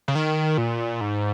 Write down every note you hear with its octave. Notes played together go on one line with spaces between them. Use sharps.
C#3
D#3
A#2
G#2